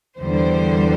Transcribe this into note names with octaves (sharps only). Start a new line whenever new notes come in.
E2 D3 G3 C5